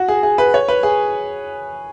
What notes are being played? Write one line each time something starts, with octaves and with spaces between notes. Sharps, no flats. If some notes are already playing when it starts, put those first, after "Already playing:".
Already playing: F#4
G#4
G#4
B4
C#5
B4
G#4